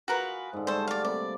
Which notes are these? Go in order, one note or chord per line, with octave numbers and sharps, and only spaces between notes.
F4 F#4 G#4 A#4 B4
G#2 D3
G3 A3 A4 C5 A5
D5 F5
C3 A#3 D5 B5